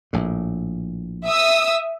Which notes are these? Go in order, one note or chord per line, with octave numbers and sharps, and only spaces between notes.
A#1 A2
E5 D#6 E6